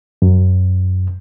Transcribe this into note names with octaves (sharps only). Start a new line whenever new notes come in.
F#2